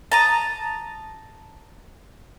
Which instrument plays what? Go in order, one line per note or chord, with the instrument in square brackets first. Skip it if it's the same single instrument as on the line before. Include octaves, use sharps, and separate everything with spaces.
[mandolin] A5 A#5 D#6